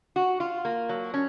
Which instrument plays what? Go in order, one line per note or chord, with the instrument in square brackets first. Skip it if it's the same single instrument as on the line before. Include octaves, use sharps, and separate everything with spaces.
[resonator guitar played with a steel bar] F#4
F4
A#3
F#3
C#4